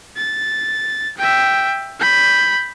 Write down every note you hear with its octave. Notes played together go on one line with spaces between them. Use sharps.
A6
E5 G5
B5 G6